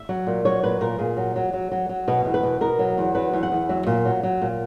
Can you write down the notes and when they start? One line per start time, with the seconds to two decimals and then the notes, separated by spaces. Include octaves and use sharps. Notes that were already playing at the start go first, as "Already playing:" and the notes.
Already playing: E5
0.09 F#3
0.27 A#2
0.45 F#3 C#5
0.63 A#2 B4
0.81 A#2 A#4
0.99 A#2 G#4
1.17 F#3
1.36 F#3
1.53 F#3
1.71 F#3
1.89 F#3
2.08 B2 B4
2.25 E2
2.34 B4
2.43 B2
2.61 B2 A#4
2.79 F#3
2.98 E2
3.15 F#3 B4
3.33 E2
3.43 F#5
3.52 E2
3.69 F#3 E5
3.87 A#2
4.05 F#3
4.23 F#3
4.42 A#2